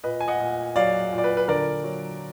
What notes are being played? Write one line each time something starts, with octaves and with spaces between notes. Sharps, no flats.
A#2 B4 D#5
G#5
D#5 F#5
A#2
F#3 D5 F5
A#2
D5
B4
B4
D3 A#4 D5
F#3